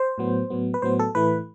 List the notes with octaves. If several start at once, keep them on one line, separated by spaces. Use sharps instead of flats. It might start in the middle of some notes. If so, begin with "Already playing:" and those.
Already playing: C5
A2 F#3 B3
A2 F#3 B3
B4
A2 F#3 B3 C5
A4
A2 E3 A3 B4